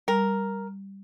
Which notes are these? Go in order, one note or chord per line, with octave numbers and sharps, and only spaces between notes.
G3 A#4